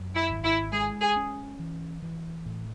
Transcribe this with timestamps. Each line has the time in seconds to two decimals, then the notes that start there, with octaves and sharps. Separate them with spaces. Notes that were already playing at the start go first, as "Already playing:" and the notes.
Already playing: F#2
0.15 E4
0.29 G#1
0.44 E4
0.72 G#3 G#4
1.01 G#4
1.16 C#4
1.59 E3
2.02 E3
2.46 A2